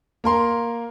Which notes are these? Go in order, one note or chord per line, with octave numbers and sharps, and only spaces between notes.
A#3 A#4 C6